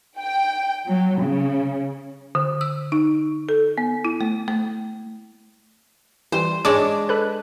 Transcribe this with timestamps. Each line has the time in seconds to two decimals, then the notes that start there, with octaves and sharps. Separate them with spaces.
0.20 G5
0.87 F#3
1.21 C#3
2.35 D3
2.61 E6
2.92 D#4
3.49 A4
3.78 B3
4.05 E4
4.21 A3
4.48 A3
6.32 E3 G3 C5
6.65 G#2 G#3 D4 C#5 D6
7.09 A4 B4 F#6